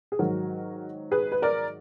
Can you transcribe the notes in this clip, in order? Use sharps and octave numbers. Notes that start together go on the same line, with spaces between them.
G#4
G#2 D#3 F#3 F#4 A#4
G#4 B4
B4
A#4 D5